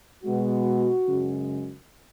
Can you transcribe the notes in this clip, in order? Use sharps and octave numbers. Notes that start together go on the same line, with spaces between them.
B2 G#3 B3 F#4
F#2 C#3 G#3